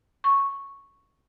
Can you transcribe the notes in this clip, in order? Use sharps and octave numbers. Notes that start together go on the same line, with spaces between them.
C#6